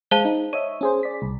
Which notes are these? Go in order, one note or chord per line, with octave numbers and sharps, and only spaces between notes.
G#3 C5 F5 A5
D#4
C#5 D#5 E5 D#7
C#4 G#4 C5
D5 B6
C2